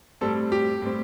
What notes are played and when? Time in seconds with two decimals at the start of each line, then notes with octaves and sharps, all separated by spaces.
0.21 A2 G3 C4 A4
0.52 G4
0.82 A2 G3 C4